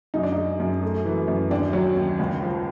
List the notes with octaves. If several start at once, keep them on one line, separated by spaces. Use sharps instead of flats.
F#2 D#4
D4
G#3 D#4
F#2
A3
E3
F#2
D#2 D4
F#3
D#2
C#2
F3